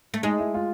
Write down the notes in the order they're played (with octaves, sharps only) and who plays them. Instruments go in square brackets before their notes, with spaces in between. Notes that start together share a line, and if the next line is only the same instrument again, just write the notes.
[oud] A3
[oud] G#3 [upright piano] D#4
[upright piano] E4
F4